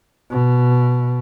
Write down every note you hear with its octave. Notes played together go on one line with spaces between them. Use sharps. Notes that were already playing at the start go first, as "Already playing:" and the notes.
B2